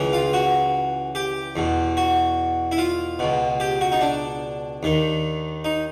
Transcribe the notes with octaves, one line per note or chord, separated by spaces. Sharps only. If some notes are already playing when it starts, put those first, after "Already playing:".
Already playing: C#2 C#3 E3
F4
F#4
G4
E2 B2
F#4
E4
F4
C#2 B2
G4
F#4
D#4
D4
D#2 D#3
D#4